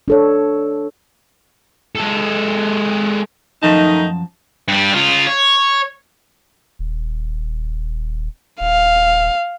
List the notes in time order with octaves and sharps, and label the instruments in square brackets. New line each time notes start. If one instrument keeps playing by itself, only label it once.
[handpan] D4 A4 C#5
[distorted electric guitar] G#3 A4
[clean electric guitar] F#2 F3 A5 [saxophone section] D#3 A3 D#4
[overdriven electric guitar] G2 G3
C#3 F4
C#5
[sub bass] D#1
[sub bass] D#1 [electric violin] F5